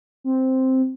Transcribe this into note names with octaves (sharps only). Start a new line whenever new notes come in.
C4